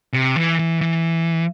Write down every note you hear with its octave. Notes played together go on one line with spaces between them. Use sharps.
C3
E3
E3
E3